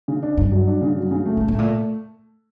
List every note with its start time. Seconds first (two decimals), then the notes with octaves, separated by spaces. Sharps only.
0.08 C#3
0.22 D4
0.37 G2 D4
0.52 F#3
0.67 D4
0.82 C#3
0.96 F#3
1.11 C#3
1.26 A3
1.37 A2
1.41 A3
1.48 A2
1.55 A#2 A3